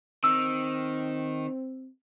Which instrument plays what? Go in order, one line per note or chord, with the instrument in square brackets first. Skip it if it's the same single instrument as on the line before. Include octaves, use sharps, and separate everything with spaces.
[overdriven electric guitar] D#3 [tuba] C4 [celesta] E6